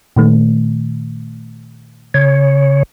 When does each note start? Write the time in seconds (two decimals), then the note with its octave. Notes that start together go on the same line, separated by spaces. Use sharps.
0.16 A#2 D#3 A3
2.14 C#3 C#5